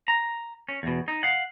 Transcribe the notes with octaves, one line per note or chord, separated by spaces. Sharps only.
A#5
C#4
E2 B2
D#4
F5 F#5